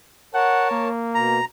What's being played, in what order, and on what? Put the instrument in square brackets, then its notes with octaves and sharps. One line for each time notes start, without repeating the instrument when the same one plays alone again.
[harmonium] A#4 C#5 A5 [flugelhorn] F#5
[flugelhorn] A#3
[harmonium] B2 [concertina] A#5